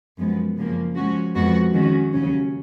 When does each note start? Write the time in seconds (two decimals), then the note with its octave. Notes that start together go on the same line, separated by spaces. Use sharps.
0.18 F#2 F3 G#3 B3
0.56 F#2 C#3 F3 A#3
0.95 F3 G#3 C#4 F#4
1.35 F2 F3 G#3 B3 F#4
1.73 D#3 G#3 C#4 F#4
2.12 D#2 C#3 F#3 C#4